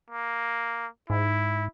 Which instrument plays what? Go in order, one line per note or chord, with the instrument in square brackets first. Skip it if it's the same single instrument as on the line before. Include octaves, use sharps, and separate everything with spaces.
[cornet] A#3
[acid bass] G#2 [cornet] E4